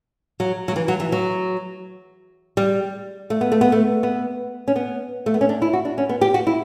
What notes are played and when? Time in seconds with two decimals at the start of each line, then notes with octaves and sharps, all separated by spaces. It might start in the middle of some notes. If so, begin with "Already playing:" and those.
0.40 F#3
0.68 F#3
0.76 E3
0.88 F#3
1.00 E3
1.12 F#3
2.57 G3
3.30 A3
3.41 B3
3.52 A3
3.61 B3
3.72 A3
4.03 B3
4.68 C#4
4.76 B3
5.26 A3
5.34 B3
5.41 C#4
5.49 D4
5.62 E4
5.73 F#4
5.85 D4
5.98 C#4
6.09 B3
6.21 G4
6.34 F#4
6.47 E4